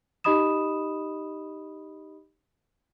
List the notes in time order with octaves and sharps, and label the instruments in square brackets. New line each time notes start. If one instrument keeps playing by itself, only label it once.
[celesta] D#4 G4 D#5 B5 D#6 E7